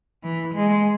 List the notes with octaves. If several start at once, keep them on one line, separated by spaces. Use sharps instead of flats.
E3
G#3